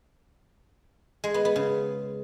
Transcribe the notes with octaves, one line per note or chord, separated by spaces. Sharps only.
G#3
B3
B3
C#3